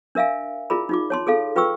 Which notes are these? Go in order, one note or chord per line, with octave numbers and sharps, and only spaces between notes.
D4 A#4 E5 F5 G#5
E4 F4 G#4 A#4 D5 B5
D#4 F4 D6
C#5 A5 C6
G#4 A4 F5 A5
F4 B4 G5 C#6 E6